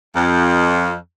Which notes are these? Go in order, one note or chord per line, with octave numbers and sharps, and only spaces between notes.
F2